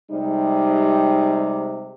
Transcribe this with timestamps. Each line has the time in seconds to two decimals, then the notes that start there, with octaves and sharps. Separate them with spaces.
0.11 C3 G3 G#3 D#4